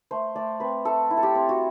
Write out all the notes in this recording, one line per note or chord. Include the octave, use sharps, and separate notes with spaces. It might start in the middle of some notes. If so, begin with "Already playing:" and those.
A3 C5
A3 D5
C4 B4
A3 A4
E4
A4
G4
C4
F#4